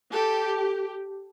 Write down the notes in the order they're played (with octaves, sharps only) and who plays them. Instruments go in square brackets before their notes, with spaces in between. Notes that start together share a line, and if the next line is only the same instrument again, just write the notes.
[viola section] G4 [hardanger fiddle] A4